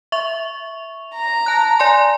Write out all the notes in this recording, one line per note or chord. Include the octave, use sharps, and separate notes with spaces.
E5 C#6 F7
A#5
A5 F#6
D5 G#5 C6